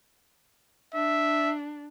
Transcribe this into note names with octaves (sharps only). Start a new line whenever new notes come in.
D4 E5